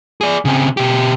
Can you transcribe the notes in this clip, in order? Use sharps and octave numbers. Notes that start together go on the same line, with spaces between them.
G#4 D5
C#3 C4
B2 G4